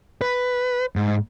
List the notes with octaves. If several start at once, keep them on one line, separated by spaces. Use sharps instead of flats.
B4
G#2